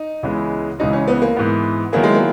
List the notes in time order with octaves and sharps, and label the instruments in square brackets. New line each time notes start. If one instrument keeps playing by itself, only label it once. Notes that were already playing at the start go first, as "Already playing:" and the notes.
Already playing: [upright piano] D#4
[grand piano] C#2 C#3 E3 G#3 B3
[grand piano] C#2 C#3 E3 G#3 [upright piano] D#4
[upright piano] C#4
B3
A#3
[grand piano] G#2 E3 B3
[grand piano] D#3 F#3 B3 E4 G#4 [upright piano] A#3
[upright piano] G#3
A#3